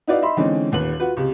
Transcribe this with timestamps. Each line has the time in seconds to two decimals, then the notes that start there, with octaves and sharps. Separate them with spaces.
0.08 D#4 E4 F#4 B4 D5 F5
0.21 D#4 D#5 E5 B5 C6
0.37 D3 E3 G#3 C4 C#4 D#4
0.72 D#1 D#2 B4 F#7
1.00 F4 F#4 B4
1.17 C#2 C3